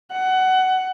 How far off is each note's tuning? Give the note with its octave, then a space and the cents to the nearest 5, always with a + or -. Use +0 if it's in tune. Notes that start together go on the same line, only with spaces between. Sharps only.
F#5 +20